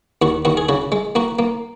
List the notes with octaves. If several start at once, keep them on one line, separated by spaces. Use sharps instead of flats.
D#2 F#4
D#2 F#4
G#4
C#3 F#4
G#3
A#3 F#4
A#3